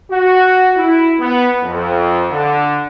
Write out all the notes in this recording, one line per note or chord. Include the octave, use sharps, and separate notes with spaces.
F#4
E4
B3
F2
D3